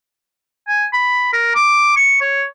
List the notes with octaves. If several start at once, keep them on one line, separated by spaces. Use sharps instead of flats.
G#5
B5
A#4
D6
C#6
C#5